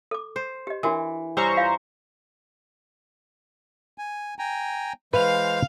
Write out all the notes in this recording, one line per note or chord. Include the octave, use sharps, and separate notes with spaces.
A4 D6
C5
G4 D#5
E3 D4 F#4 A#4
G2 C#4 C5 E5 A#5 C#6
F4 F5
G#5
G5 G#5 A#5
E3 G#3 B4 C5 F5 F7